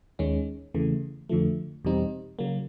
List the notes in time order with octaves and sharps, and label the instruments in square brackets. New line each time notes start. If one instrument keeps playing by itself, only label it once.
[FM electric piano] D#2 D#3 G#3 C#4
E2 C#3 E3 A3
F2 D3 F3 A3
E2 B2 G3 C4 D#4
C#3 F#3 A#3